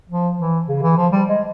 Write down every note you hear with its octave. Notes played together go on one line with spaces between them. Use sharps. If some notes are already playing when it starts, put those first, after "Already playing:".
F3
E3
C#3
E3
F3
G3
G#3